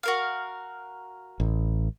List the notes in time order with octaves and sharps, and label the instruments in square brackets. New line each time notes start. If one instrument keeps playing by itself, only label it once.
[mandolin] F#4 A#4 F5
[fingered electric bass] A1